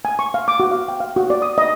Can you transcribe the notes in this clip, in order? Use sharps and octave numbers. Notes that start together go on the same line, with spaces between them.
G#5
C#6
F5
D6
F#4
F5
G5
F5
F#4
D5
D#6
D#5